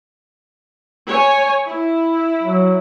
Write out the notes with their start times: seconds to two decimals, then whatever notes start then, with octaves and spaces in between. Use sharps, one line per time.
1.09 C#5 G#5
1.64 E4
2.43 F#3